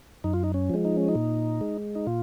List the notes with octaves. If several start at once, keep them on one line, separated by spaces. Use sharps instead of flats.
F#2 D#4
F4
D#4
C#4
F3 G#3
D#4
C#4
D#4
A#2
G#3
D#4
A#2 F4